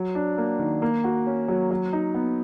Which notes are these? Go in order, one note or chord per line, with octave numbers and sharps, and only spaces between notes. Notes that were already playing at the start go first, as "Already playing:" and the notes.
Already playing: F#3
D4
A#3
D#3
A#3
F#4
C#4
F#3
F#3
D#4
B3